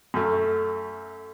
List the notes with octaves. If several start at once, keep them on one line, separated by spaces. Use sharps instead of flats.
F#2 A3